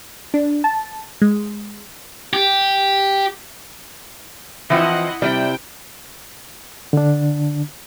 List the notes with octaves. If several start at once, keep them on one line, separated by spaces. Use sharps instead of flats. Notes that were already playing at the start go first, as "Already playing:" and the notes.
D4
A5
G#3
G4
E3 F3 C4 E4 D#5 F#5
C3 G3 E4 A#4 D5 G5
D3 D4